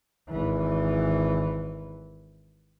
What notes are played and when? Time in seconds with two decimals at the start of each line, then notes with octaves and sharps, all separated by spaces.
0.29 G#1 E3